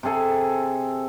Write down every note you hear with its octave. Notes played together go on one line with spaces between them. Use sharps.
C3 G#4 A4 G#5